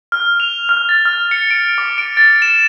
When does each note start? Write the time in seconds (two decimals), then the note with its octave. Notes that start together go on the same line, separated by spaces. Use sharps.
0.12 F6
0.40 F7
0.69 F6
0.89 A6
1.05 F6
1.31 C#7
1.51 D7
1.78 D6
1.98 D7
2.17 A6
2.42 E7